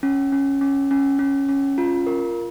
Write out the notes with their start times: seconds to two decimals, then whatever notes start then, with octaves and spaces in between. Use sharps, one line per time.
0.03 C#4
0.32 C#4
0.61 C#4
0.91 C#4
1.19 C#4
1.49 C#4
1.78 F4
2.07 A#4